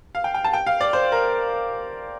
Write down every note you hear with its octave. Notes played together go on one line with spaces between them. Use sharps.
F5
G5
G5
A5
G5
F5
D5
C5
A#4